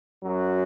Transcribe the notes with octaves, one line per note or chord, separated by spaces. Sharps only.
F#2 F#3